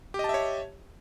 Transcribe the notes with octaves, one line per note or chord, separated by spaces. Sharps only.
G4 C#5 D#5 E5 A5